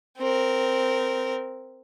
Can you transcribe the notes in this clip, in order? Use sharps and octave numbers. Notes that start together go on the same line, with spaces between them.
C4 A#4